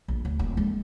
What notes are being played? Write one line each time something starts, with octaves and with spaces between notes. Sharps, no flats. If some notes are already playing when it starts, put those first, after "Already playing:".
A#1
D2
D#1 A#3
G#3 A#3